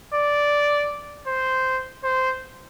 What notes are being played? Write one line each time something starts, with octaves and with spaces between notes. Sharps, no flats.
D5
C5
C5